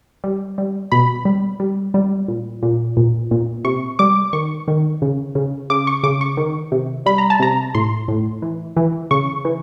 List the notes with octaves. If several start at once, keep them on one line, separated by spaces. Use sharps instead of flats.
G3
G3
B2 B5
G3
G3
G3
A#2
A#2
A#2
A#2
C3 C#6
G3 D6
D#3 C#6
D#3
C#3
C#3
C#3 D6
C#6
C#3 D6
C#6
D#3
C3
G3 B5
A#5
A5
C3 A#5
A2 C6
A2
E3
E3
C#3 C#6
E3